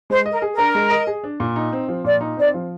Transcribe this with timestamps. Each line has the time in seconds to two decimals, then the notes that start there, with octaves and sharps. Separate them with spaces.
0.10 G#3 C5
0.26 D#5
0.31 A#4
0.42 G#4
0.53 D4 A#4
0.75 G#3
0.91 D#5
1.07 G#4
1.24 D4
1.40 A#2
1.56 D#4
1.72 C4
1.88 F3
2.04 A#2 D5
2.21 D#4
2.37 C4 D5
2.54 F3